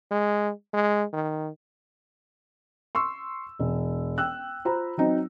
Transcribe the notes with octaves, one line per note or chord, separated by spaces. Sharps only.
G#3
G#3
D#3
C6 C#6 E6
E1
G5 E6 F#6
F4 C5 A#5 B5
F#3 C4 D#4